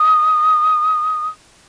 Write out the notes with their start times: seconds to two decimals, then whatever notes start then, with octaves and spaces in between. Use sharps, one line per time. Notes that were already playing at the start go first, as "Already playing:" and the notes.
Already playing: D#6